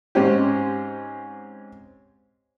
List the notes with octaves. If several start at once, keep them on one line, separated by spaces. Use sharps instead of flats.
G#2 C4 C#4 G4